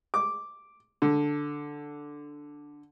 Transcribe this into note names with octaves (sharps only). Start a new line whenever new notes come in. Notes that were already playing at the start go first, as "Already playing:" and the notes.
D6
D3